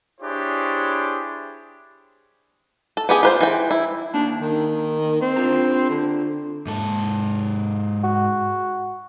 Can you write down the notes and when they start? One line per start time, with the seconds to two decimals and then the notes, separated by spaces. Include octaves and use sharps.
0.21 D4 E4 G4 G#4 C5 C#5
2.97 A4
3.09 B3 G4 G#4
3.23 F4 B4 C5
3.41 E3 G5
3.71 E4
4.14 A#3 D4 D#4
4.41 D#3
5.21 C4
5.36 D4 F4 A#5
5.90 D3
6.67 G#2 A4
8.04 F#4